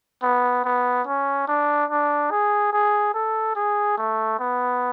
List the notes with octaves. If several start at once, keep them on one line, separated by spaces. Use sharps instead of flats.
B3
B3
C#4
D4
D4
G#4
G#4
A4
G#4
A3
B3